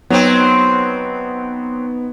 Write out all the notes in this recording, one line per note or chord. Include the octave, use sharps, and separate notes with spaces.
F#3 B3 C4 D#4